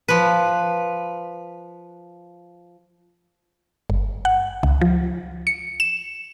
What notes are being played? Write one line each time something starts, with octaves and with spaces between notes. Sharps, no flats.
F3 B4
G1
F#5
C#2
F3
C#7
E7